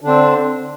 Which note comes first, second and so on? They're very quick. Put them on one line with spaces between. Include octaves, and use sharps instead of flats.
D3 D4 C4